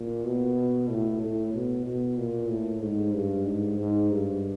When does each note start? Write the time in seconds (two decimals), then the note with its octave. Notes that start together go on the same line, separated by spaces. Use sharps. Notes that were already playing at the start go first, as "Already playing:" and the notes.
Already playing: A#2
0.25 B2
0.90 A2
1.22 A2
1.54 B2
1.86 B2
2.17 A#2
2.50 A2
2.82 G#2
3.14 G2
3.46 G#2
3.78 G#2
4.11 G2